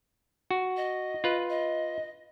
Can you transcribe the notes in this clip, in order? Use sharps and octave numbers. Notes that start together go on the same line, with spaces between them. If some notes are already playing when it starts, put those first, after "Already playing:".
F#4
D#5
F4 B4
D#5